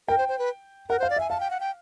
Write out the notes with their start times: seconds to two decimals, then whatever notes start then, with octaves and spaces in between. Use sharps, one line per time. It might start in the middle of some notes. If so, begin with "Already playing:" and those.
0.08 A#4 G5
0.18 C5
0.28 C5
0.39 B4
0.89 A#4 F#5
0.99 C5 F5
1.10 D5
1.17 E5 G#5
1.30 F5 A5
1.40 G5
1.50 F#5
1.60 G5